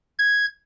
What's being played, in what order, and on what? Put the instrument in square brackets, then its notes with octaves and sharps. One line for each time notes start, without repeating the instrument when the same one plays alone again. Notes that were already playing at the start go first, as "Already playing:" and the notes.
[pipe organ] G#6